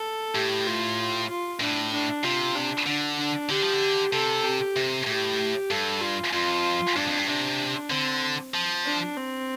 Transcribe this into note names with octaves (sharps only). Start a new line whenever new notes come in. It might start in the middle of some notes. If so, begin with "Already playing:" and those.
Already playing: A4
A2 G4
F4
F4
A2 D4
D4
C3 F4
D4
D3 D4
D4
D3 G4
F3
D3
C3 A4
G4
C3
A2 G4
G2 A4
F4
F2 F4
G2 D4
F2
G2
C3 D4
D3 C4
F3
D4
C4